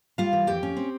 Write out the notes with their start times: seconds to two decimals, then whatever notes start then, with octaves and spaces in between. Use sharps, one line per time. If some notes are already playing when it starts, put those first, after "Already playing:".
0.18 G3 F4 F5
0.33 E3
0.47 F2 G4 G5
0.63 C#4
0.77 C4